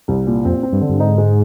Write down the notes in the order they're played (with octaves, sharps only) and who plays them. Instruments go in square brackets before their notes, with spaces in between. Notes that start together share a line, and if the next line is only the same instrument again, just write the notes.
[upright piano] C2
A#2
[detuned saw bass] F2 [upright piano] C4
[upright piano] C4
[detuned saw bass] G2
[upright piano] D3
[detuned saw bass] G2
[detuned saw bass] G#2 [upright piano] D#4
[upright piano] G#3